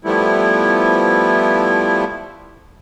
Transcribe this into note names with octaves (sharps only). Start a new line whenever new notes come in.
F3 G3 A3 B3 E4